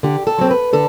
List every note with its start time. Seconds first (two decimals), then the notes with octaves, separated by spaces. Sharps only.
0.03 D3 G4
0.27 A4
0.38 F#3 C4
0.51 B4
0.73 D3 A4